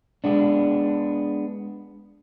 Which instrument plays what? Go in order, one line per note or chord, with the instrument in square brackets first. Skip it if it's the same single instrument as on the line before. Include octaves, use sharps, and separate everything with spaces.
[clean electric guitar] G#3 B3 D4